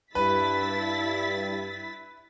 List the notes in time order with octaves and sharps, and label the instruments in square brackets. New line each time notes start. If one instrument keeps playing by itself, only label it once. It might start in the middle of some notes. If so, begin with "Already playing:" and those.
[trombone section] G2 [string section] E4 A6 B6 [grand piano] B4